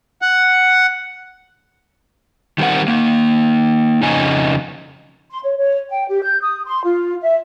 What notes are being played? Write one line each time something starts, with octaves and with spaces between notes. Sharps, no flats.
F#5
D#3 G3 C4 A#4 F#5
A#3 D#4
F2 C#3 D#4 G#5
C6
C#5
C#5
G5
G4
G6
D#6
C6
F4
E5